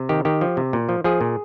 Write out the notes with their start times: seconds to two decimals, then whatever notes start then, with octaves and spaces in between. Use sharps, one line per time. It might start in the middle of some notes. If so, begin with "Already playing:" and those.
Already playing: C3
0.09 D#3 G4
0.25 D#3 G4
0.41 F3
0.57 C3
0.73 A#2
0.89 F3
1.04 F3 G#4
1.21 A#2